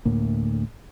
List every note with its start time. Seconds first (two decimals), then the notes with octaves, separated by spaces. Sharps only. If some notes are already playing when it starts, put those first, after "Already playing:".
0.05 D2 A2 A#3